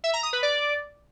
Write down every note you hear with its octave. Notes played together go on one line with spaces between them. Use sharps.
E5
A#5
D#6
B4
D5